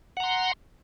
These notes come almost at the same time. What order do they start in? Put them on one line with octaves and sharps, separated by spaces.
F#5 A#5 C6